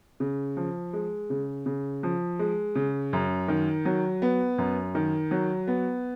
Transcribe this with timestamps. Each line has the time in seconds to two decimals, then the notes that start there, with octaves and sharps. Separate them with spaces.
0.20 C#3
0.57 F3
0.93 G#3
1.30 C#3
1.66 C#3
2.03 F3
2.39 G#3
2.75 C#3
3.13 F#2
3.48 D#3
3.85 F#3
4.22 B3
4.58 F#2
4.95 D#3
5.31 F#3
5.67 B3